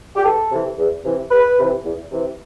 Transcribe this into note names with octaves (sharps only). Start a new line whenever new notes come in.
G4
E2 A4
C3 E3
E2
C3 E3
E2 B4
C3 E3
E2
C3 E3